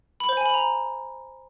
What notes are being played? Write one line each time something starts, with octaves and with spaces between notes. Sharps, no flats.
B5
C5
G#5
B5
A#5